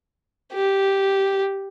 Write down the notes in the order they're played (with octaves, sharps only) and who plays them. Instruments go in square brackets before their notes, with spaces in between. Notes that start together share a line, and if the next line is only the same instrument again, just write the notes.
[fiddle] G4